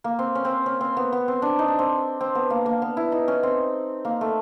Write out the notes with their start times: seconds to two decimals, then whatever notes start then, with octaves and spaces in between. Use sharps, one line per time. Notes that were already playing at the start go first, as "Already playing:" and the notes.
0.04 A#3
0.19 C4
0.35 C#4
0.45 C4
0.66 C#4
0.81 C4
0.97 B3
1.12 B3
1.28 C4
1.42 D4
1.59 D#4
1.68 D4
1.79 C4
2.21 C4
2.35 B3
2.50 A#3
2.66 A#3
2.82 B3
2.97 E4
3.12 D#4
3.28 C#4
3.43 C4
4.05 A#3
4.21 A3